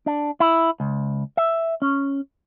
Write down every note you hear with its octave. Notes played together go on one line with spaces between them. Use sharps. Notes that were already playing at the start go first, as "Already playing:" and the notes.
D4
E4
C#2
E5
C#4